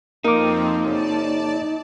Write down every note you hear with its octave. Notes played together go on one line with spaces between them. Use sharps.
F2 F3 A#3 C4 D#4 A#4 D6
F#2 C#3 D5 A5